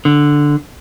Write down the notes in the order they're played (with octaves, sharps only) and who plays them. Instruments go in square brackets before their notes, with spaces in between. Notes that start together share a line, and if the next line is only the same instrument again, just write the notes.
[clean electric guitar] D3